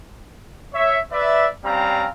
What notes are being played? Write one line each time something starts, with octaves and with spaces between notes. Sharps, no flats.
C#5 E5
B4 D5 E5
G3 C4 C#4 F5 A#5